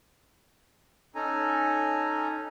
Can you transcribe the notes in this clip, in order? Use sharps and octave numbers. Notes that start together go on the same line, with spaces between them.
C#4 D#4 A4 G#5 A#5